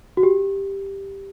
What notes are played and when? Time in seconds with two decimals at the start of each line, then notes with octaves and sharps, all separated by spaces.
0.17 F#4
0.23 G4